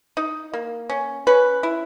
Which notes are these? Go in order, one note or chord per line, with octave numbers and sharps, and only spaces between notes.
D#4
A#3
C#4
C#4 B4
E4